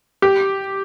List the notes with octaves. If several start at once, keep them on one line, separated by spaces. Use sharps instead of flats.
G4